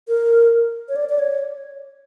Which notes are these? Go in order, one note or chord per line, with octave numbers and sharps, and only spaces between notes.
A#4
C#5
D5
D5
C#5